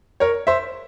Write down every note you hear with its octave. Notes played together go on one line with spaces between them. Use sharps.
A#4 C#5
C5 E5